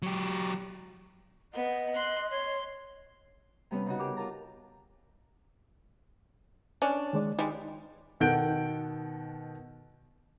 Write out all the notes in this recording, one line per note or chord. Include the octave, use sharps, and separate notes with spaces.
F#3 G4
B3 D#5
C6 F#6
C#5 C6
C3 G3 B3 C#4 B4
C#3 D#4 F#4
G4 G#4 A#4 D6
F4 A#4 A5 A#5
C#4 D4
D#3 G#3 D5
G3 G#3 D#4
B2 D#3 A4 F#5 G6 D7